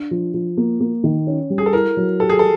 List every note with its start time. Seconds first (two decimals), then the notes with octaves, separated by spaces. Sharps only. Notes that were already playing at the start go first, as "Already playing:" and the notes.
Already playing: D4
0.11 F3
0.34 F3
0.57 A#3
0.80 A#3
1.04 D#3
1.27 C#4
1.50 G3
1.58 G#4
1.66 A4
1.73 E4 A#4
1.97 F#3
2.20 G4 A4
2.29 G#4
2.39 A4